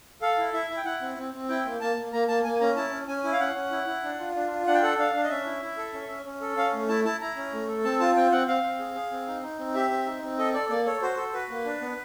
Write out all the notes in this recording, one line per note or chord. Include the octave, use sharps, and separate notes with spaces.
A4 F5
E4
E4 E5
E4
G5
E4 F#5
C4
C4
C4
E4 G5
A#3
A#3 A5
A#3
A#3 A#5
A#3 A5
A#3 G#5
C#4 A#5
E4 A5
C#4
C#4 G#5
E4
F5
C#4 F#5
C#4
E4
E4
D4
F4
D4
F4
D4 F#5
G5
A4 F#5
D4 F5
D4
D#5
C#4 E5
E4
E4
A4
C#4
C#4
C#4
A4
C#4 F5
A3
E4 A5
E4 A5
E4 A#5
C#4
A3
A4
C4 A5
F4 A5
C4 G5
C4 F#5
C4 F5
C4
G#4
G#4
C4
D#4
D#4
C4
G4 E5
C4
D#4
C4
A4 D#5
A4 D5
A#3 D5
A4 C#5
F#4 C5
A4
F#4 B4
A#3
D4
B3